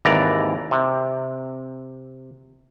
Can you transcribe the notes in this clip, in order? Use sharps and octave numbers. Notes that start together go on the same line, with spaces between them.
G#1 D#2 E3 D5 A#5
C3